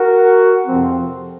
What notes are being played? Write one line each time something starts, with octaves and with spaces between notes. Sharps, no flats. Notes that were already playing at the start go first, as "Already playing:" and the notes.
Already playing: F#4 A#4
F2 C3 F3 C4